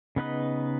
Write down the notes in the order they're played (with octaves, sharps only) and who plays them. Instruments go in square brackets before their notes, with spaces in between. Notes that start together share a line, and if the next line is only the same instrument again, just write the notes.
[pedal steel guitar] C#3 B3 D#4 B4 D#5